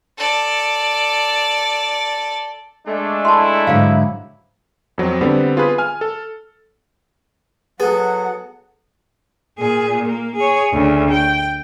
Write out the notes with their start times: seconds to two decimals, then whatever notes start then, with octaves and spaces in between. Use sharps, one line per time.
0.18 A4 D5
2.87 G#3 A3 D4
3.25 E4 A5 C6
3.67 G#2 D3 F#3 F5
4.98 F2 F#3 C4
5.21 D3 G3 B3 C4
5.57 F4 G#4 B4
5.78 G#5 F6
6.01 A4
7.80 F#3 B3 G#4 A4 F#5
9.59 A#2 G#4
10.06 A#3
10.36 G#4 C#5
10.73 D2 C#3
11.11 G5